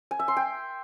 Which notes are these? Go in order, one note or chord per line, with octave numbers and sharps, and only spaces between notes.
G#5
E5
C6
G5